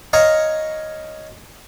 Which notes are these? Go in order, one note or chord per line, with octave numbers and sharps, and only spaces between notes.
C#5 D#5 F5 A#5